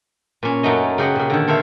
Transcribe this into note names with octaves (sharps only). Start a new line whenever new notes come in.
A#2 C#4
F#2 F#3 A3 D#4 D#5
C#3 G4 D#5 F#5
A#2 C#3
D3 D#3
A4 A#4 C5 C#5 E5 F5